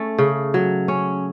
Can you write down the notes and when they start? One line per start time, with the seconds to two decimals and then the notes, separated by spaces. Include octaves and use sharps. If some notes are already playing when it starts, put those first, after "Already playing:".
Already playing: A3 C#4
0.18 C#3
0.54 F#3
0.88 C#4